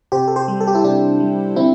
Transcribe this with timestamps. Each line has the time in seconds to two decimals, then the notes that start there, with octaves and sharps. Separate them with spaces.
0.12 C3 G4 C5
0.28 A4
0.36 G4 C5
0.48 G3
0.60 A4
0.67 G4
0.75 E4 A4
0.84 C3 D4 G4
1.20 G3
1.56 D3 C4 E4